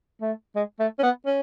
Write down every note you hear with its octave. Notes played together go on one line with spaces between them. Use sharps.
A3
G#3
A3
C#4
B3
C#4